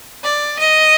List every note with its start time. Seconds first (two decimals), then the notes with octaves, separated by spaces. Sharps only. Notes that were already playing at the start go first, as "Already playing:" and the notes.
0.23 D5
0.59 D#5